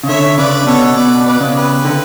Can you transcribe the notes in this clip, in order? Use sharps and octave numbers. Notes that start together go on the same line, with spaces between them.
C#3
D3 C#5 E5
C#3 B4 D5
B2 A4 C#5
B2 B4 D5
B4 D5
C#3
G4 B4
D3